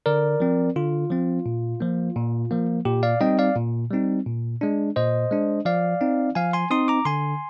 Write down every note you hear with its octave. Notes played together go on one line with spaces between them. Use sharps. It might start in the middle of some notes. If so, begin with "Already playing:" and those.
D3 A#4 D5
F3 C4
D3 F4
F3 C4
A#2
F3 A#3
A#2
F3 A#3
A#2 G4
D5 F5
G3 C4 D#4 D#5 G5
D5 F5
A#2
G3 C4 D#4
A#2
G#3 D4
A#2 C5 D#5
G#3 D4
F3 D5 F5
C4 D#4
F3 F5 G#5
G#5 C6
C4 D#4 C6 D#6
A#5 D6
D3 G#5 C6